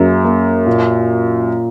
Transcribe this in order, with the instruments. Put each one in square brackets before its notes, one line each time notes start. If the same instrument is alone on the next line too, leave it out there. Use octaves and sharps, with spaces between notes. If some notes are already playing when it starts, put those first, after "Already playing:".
Already playing: [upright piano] F#2 [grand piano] A#3 G#4
[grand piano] A#3
A#2